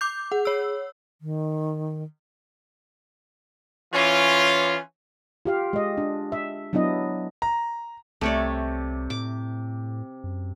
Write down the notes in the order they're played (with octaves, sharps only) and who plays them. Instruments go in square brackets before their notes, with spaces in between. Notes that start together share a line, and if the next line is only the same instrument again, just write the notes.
[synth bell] D6 G6
[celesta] G#4 [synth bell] F#5
[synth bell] C#5 E6
[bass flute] D#3
[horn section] E3 C#4 F4
[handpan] F4 G4 F5
G#3 D#5
D4
E5
F#3 B3 D4 E4 D#5
[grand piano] A#5
[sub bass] C2 [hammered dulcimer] C3 [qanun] A3 C#5 D5
[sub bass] A2 [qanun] D6
[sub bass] F#2